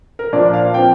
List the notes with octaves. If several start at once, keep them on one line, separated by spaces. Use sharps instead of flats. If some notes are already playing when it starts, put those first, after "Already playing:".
A#4
A#2 F3 A#3 D4 D5
F5
F3 C4 G5